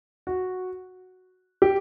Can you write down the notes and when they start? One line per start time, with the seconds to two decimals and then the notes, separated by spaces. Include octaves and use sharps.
0.27 F#4
1.62 G4